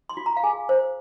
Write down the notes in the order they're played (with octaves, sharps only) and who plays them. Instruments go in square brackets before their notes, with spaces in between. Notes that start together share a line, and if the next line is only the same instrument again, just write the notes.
[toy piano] C6
F4
A#5
F5
G#4 G#5
C5